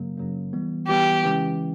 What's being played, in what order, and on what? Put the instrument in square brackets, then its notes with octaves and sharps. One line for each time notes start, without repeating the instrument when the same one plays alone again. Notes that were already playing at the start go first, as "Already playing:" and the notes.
Already playing: [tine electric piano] F#2 C#3 F#3 A#3
F#2 C#3 F#3 A#3
E3 G3 B3
[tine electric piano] E3 G3 B3 [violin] G4
[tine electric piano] C#3 E3 G#3 C#4